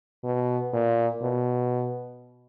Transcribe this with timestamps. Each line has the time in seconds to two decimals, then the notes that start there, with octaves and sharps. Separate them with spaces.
0.24 B2
0.73 A#2
1.22 B2